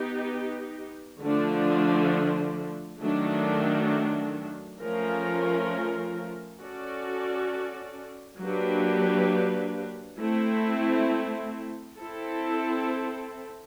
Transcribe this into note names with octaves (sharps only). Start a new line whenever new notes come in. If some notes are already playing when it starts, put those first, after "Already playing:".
Already playing: B3 D#4 G4
D3 F3 A3 D4
D#3 F#3 A3 D4
F3 A3 C#4 F4 A#4
C#4 F#4 A4 D5
F#3 A#3 D4 G4 B4
A3 C4 E4
C4 E4 A4